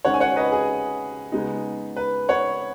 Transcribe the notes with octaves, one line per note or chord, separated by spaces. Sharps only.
D#3 G#3 C#4 C#5 F#5
G#5
C#5 F#5
B4 D#5
G#4
C#3 G#3 B3 D#4
B4
C#5 F#5